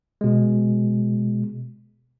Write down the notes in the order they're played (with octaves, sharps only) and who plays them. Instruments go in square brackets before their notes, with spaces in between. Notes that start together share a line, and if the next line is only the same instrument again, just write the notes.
[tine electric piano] B2 G#3